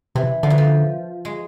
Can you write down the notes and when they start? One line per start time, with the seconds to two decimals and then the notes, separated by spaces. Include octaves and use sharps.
0.15 C3 E3
0.43 D3 F3
0.50 E3
0.58 F3
1.25 G#3